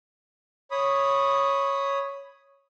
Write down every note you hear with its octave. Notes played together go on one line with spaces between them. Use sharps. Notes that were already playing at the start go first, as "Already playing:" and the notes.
C#5 B5 D#6